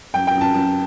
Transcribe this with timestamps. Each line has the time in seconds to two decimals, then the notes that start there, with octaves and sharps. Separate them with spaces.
0.14 F#2 G5
0.27 G5
0.35 F#2
0.41 A5
0.54 F#2